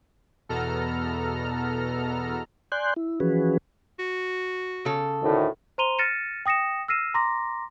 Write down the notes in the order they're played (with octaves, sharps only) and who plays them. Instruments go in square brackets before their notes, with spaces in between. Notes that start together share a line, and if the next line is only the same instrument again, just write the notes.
[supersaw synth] E2 B2 B3 A4 A#5 F6
[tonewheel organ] D5 G#5 C6 F#6 G6
E4
E3 F3 C#4 F#4 G#4 B4
[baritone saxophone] F#4
[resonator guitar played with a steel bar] C#3 A4
[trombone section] D2 A2 D#3
[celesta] C5 A#5 C6 D#7 F7 G7
F6 A6 A#6 C#7 D#7 E7
G5 D#6 A#6 C#7 E7
E6 F6 A#6 C7 D#7 E7
A#5 C6 D6 A#6